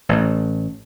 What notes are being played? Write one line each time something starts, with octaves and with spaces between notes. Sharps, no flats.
A1 A2